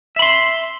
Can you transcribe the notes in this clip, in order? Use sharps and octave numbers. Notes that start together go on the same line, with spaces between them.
E5 B5 C6